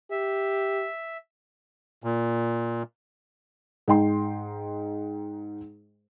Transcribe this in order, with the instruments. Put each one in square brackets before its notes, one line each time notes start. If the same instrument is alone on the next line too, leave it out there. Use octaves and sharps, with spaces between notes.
[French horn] G4 [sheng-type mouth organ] E5
[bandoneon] A#2
[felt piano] G#2 D#4 G5 C6